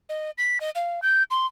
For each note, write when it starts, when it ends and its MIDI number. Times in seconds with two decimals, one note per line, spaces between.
0.09 0.31 75
0.38 0.58 95
0.61 0.70 75
0.75 1.00 77
1.02 1.23 91
1.31 1.46 84